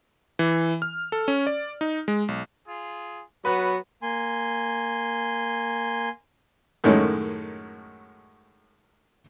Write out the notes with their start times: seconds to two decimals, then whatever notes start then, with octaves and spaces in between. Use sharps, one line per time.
0.39 E3
0.82 F6
1.12 A4
1.28 C#4
1.47 D5
1.81 D#4
2.08 G#3
2.28 B1
2.67 F4 G#4
3.45 F#3 B3 F#4 B4
4.02 A#3 G#5 C6
6.84 F#2 A2 D#3 G#3 A3 C#4